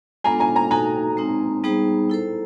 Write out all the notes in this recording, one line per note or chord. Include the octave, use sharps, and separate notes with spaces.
G#3 B3 D4 F4 A4 G#5 A#5
G#5 A#5
G#5 A#5
D#4 F#4 A4 G#5 A#5
G#3 C4 D#4
G3 B3 D#4 G#4 C5
E4 A4 C5